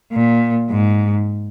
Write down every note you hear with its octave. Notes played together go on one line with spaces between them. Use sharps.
A#2
G#2